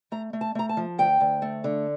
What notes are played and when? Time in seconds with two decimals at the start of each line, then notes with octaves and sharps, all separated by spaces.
0.12 A3 A#5
0.33 A3
0.41 A5
0.55 A3 A#5
0.69 A5
0.77 F3
0.98 D2 G5
1.20 D2
1.42 A3
1.64 D3